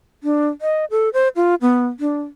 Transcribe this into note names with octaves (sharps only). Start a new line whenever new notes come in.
D4
D#5
A4
C5
F4
B3
D4